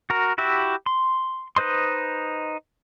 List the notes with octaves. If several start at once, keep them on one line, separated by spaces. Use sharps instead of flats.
F#4 A#4
E4 F#4 G4 E5
C6
D#4 B4 C5 D#5 C6